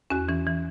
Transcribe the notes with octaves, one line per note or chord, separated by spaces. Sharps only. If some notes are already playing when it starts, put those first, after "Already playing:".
E2 C#4 F#4
E3 C#4
E3